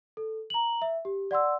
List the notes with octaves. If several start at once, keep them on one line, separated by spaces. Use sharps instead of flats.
A4
A#5 F#7
E5
G4
D5 F#5 C6 E6